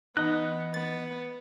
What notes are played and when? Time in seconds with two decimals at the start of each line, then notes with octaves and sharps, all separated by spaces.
0.17 E3 B3 D#4 D#5 F#6
0.74 B3 A6